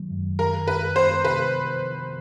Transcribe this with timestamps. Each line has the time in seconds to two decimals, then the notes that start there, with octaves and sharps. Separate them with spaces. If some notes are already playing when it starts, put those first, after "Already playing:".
Already playing: D#3 F#3 G#3
0.11 F#2
0.39 D#3 A#4
0.68 D#3 B4
0.96 B3 C5
1.25 C3 B4
1.53 F3